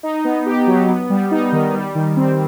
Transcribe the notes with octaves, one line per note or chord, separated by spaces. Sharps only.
D#4
B3
G4
F#3
B3
G3
D#4
D#3
G3
D#3
C4